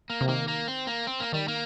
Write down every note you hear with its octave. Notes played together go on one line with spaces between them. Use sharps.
A#3
C3
D#3 A#3
A#3
C4
A#3
C4
A#3
D#3 G3
A#3